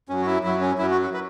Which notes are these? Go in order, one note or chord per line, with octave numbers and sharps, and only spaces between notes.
F#2 F#3 C#4
F#4
E4
F#2 F#3 E4
C#4
F#2 F#3 E4
F#4
F#4
B4